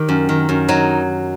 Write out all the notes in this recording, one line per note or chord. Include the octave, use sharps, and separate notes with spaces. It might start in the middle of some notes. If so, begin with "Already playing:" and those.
Already playing: D#3 G4
F#2
D#3
F#2
F#3 D#4